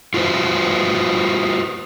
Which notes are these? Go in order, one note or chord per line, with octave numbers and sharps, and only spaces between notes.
F4 F#4 B4 C5